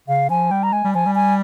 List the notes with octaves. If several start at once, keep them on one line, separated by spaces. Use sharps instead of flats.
C#3 F5
F3 G#5
G3 G5
A#5
G#3 G#5
G3
F3 G#5
G3
G#5